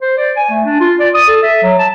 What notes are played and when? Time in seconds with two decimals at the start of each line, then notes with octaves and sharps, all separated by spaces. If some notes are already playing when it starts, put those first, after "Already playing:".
0.01 C5
0.17 D5
0.37 G#5
0.50 A3
0.65 D4
0.80 F4
1.00 D5
1.15 D#6
1.27 A4
1.43 E5
1.63 F#3
1.79 A5